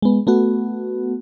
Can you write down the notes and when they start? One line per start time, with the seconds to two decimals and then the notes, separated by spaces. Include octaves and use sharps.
0.02 G#3 B3
0.27 A3 B3 F#4